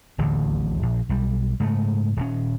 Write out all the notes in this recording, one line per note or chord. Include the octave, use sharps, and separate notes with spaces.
D1 A1 D#2 D3
A#1
B1 G3
G#2 C#3 A3
D#1 A2 C#4